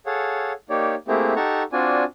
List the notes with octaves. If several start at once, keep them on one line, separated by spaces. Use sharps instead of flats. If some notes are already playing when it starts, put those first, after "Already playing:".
G#4 A4 C#5 F5 F#5
A#3 D#4 G4 C#5 D5
A3 A#3 C4 E4 G4 G#4
D#4 G4 A4 F#5 A#5 C#6
C4 D4 F4 F#4 D5 G#5